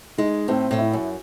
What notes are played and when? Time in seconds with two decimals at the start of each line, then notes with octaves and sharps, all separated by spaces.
0.18 G#3 D#4
0.48 A2 C4
0.71 A2
0.78 E4
0.93 F#2